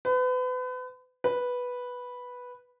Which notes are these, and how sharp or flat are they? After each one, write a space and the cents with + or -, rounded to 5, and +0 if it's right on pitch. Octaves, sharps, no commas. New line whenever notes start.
B4 +35
B4 -5